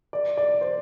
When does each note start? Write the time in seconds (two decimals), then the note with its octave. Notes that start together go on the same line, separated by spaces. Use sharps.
0.13 D5
0.37 D5
0.61 C5